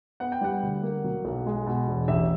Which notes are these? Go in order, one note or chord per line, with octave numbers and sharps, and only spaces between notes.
B3 F#5
G5
G3 F#5
D2
A#3
F#3
B1
G#3
B2
E1
A1 E5